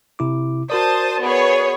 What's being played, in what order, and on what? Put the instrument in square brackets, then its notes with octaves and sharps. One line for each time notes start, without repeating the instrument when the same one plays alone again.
[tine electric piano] C3 E4 D6
[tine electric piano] F#4 A#4 D5 [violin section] C5 A5 D#6
[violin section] B3 G#4 C#5